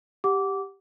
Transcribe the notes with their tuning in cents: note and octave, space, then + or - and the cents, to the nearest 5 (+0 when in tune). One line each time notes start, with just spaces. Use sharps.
G4 +0 F#5 +0 D6 -15